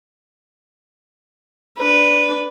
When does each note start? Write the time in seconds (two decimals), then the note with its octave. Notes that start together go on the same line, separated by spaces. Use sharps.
1.78 D4 B4